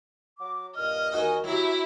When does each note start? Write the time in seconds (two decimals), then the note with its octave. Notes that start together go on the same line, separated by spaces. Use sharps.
0.39 F#3 F#5 D6
0.76 G2 A#2 D#5 F6
1.12 D#2 D#4 F#4 A#4 G#5
1.44 F#3 E4 G4 A#5